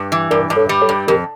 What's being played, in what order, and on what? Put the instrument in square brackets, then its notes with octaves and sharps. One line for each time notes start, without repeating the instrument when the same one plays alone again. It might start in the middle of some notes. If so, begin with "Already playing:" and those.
Already playing: [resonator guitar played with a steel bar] G2
E3
[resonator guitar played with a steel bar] G2 [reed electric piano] A#4 D5
[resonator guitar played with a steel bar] G2
[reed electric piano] A4 C#5
[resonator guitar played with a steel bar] G3
[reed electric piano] A4 C#5
[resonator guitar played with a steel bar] G2
[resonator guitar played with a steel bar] F2 [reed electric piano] G4 A#4